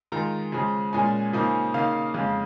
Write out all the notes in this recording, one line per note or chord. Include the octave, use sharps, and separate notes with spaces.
D#3 G#3 F4 A#5
C#3 F3 G#3
A#2 G#3 C#4 G#5
C#3 F3 A#3 D#4
C#3 A#3 D#4 F5
F2 C#3 G#3